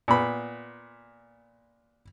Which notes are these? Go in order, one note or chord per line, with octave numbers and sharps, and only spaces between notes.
A#2 B3 B5